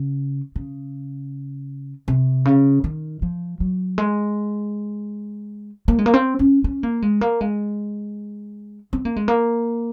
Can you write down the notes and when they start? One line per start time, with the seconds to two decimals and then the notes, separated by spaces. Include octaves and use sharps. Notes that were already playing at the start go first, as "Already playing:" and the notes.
Already playing: C#3
0.56 C#3
2.08 C3
2.45 C#3
2.84 D#3
3.22 F3
3.60 F#3
3.98 G#3
5.88 A#3
5.99 G#3
6.06 A#3
6.14 C4
6.39 C#4
6.64 C#4
6.83 A#3
7.02 G#3
7.21 A#3
7.41 G#3
8.93 C4
9.05 A#3
9.16 G#3
9.28 A#3